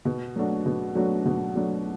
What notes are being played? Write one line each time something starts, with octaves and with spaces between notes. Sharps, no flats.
B2
F#3 A3 D4 F#4
B2
F#3 A3 D4 F#4
B2
F#3 A3 D4 F#4